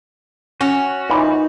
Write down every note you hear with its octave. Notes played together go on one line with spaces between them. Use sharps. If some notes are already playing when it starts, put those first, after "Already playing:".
C#4 F#4
A#2 E3 D#4